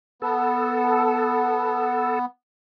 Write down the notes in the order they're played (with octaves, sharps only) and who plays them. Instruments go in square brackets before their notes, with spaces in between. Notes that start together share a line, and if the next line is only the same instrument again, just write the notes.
[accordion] B3 [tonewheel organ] A4